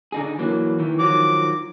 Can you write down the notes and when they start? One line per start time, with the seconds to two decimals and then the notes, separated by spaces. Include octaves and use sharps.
0.12 D3 D#4 G#4
0.39 E3 F#3 A#3
0.79 D#3 E3
0.99 D#3 F3 F#3 D6